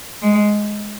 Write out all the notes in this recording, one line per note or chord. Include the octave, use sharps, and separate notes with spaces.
G#3